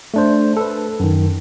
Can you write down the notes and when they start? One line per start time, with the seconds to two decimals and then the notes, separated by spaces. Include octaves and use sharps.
0.14 A3 D4 C5
0.57 A4 B4
1.00 F#2 D#3